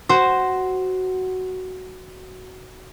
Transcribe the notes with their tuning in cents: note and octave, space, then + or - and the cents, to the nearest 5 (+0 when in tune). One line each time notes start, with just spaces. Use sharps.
F#4 +10 C5 +0